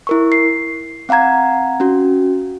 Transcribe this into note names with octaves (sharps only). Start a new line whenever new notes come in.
E4 A#4 C#6
C7
C4 F5 F#5 A#5 G#6
C#4 F#4